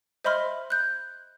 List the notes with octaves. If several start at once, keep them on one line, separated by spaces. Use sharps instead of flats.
C5 D#5 E5 B5 C6 F6
F#6 G6